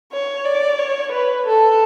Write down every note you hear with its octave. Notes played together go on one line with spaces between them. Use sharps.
C#5
D5
C#5
B4
A4